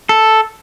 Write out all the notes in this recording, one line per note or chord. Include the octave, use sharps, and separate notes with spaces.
A4